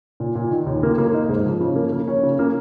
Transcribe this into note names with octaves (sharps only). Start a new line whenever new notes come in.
A#2
A#2
D#3
D#2
A#3
A#3
D#4
G#2
F3
C#3
A#3
A#3
C#4
C#3
A#3